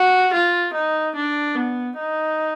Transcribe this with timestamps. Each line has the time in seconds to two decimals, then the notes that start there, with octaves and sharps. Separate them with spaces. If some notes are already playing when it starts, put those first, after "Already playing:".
Already playing: F#4
0.34 F4
0.74 D#4
1.16 D4
1.55 B3
1.98 D#4